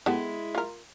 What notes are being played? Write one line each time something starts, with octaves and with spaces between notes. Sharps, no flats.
G#3 B3 E4 G4 A4
F4 A#4